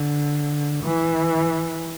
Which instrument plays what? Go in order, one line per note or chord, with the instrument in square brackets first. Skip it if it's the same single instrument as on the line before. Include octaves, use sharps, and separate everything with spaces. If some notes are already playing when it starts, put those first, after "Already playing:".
Already playing: [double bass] D3
E3